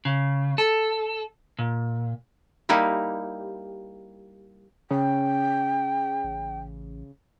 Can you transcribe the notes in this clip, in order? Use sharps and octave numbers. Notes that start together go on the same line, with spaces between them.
C#3
A4
A#2
G3 A#3 D#4 E4 G4
C#3 G5
A1